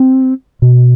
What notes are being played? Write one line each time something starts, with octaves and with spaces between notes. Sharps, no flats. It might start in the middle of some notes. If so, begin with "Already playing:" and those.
Already playing: C4
B2